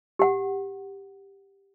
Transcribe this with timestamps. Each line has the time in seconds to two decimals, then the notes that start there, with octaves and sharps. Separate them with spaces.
0.19 G4 F#5